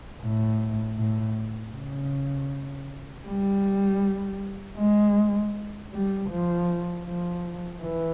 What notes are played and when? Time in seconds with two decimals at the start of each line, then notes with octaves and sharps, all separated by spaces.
0.22 A2
0.98 A2
1.74 C#3
3.26 G3
4.78 G#3
5.92 G3
6.30 F3
7.06 F3
7.81 E3